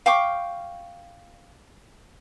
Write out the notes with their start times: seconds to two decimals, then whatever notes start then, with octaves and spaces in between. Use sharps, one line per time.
0.06 F5 G5 C#6 D6